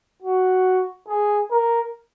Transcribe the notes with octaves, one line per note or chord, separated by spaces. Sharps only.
F#4
G#4
A#4